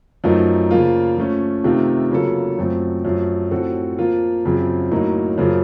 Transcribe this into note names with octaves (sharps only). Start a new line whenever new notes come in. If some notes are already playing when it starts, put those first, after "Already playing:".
F#2 F3 A3 D#4 A#4
C#3 F3 A#3 F4
F3 A3 C#4
C3 D#3 A3 C4 F4
C#3 F#3 A#3 F4 A4
F#2 F3 A3 C4
F#2 F3 A3
A2 F3 C4 F#4 A4
F3 A#3 F4
F#2 C#3 F3 C4
A2 F#3 A#3 D#4
F#2 C#3 F3 A#3